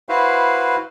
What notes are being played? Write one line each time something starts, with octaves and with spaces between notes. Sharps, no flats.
E4 F#4 B4 C5 F5